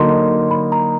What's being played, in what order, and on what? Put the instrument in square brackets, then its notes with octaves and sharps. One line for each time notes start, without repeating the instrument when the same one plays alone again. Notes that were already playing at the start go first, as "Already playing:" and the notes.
Already playing: [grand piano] D3 F#3 A#3 D#4 [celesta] C6
[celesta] B5
A#5